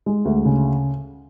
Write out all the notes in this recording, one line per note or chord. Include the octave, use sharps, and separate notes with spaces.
G#3
D2
C#3